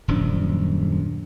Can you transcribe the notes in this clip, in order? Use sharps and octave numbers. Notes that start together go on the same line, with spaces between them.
D#1 F#2 F3 D4